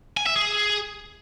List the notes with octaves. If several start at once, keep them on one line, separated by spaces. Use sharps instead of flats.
G#5
E5
G#4